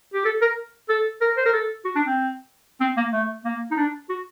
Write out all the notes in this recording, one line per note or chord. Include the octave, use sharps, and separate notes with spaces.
G4
A4
A#4
A4
A#4
C5
A#4
A4
F#4
D4
C4
C4
A#3
A3
A#3
D#4
D4
F#4